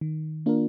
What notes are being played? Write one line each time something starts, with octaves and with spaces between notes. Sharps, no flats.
D#3
A#3 D4 F4 A#4